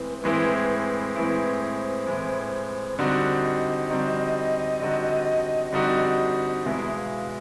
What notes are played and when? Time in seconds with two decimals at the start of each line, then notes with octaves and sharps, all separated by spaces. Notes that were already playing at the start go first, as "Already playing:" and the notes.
Already playing: A2 E3 G#3 C4 E4 B4
0.23 A2 E3 G#3 C4 E4
1.16 A2 E3 G#3 C4 E4 B4
1.61 C5
2.06 A2 E3 G#3 C4 E4
2.99 D3 G3 C4 D#4 F#4 D#5
3.90 D3 G3 C4 D#4 F#4
4.82 D3 G3 C4 D#4 F#4
5.73 D3 G3 C4 D#4 F#4
6.64 E2 B2 G#3 B3 E4 E5
6.95 F5